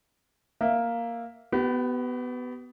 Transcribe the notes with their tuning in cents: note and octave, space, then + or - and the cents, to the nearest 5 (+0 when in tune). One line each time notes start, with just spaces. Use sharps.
A#3 +0 E5 +0
B3 +10 G4 -40